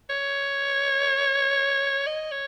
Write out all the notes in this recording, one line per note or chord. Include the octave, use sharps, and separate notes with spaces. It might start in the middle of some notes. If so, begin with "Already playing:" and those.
C#5
D#5
C#5